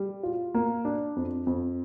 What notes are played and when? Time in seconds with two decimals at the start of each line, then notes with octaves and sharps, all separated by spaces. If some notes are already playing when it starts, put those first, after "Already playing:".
Already playing: G3
0.23 F4
0.54 A#3
0.85 D4
1.16 F2
1.47 F2